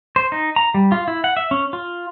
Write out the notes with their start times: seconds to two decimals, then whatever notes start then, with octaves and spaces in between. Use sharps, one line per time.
0.16 C5
0.32 D#4
0.56 A#5
0.74 G3
0.92 F4
1.08 E4
1.24 F#5
1.37 E5
1.51 C#4
1.73 F4